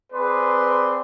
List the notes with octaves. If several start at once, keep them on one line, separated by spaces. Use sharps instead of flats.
C4 G#4 B4 D5 C6